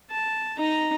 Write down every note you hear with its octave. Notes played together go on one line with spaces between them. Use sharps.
A5
D#4 A#5